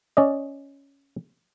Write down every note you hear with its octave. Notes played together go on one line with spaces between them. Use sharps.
C#4 D5 D#5